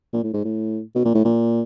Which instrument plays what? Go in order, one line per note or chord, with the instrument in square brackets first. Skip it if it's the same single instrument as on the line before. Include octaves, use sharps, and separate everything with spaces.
[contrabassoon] A#2
A2
G#2
A2
B2
A#2
A2
A#2